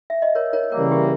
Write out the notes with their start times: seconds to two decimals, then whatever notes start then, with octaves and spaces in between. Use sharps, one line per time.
0.10 E5
0.22 D#5
0.35 A#4 C#5
0.53 A#4 C#5
0.72 C#3 E3 G3 A#3 A#4
0.91 G4